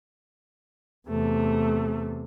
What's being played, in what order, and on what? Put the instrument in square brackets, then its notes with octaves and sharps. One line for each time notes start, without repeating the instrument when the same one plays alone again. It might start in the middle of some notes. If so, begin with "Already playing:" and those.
[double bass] E2 C3 [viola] A3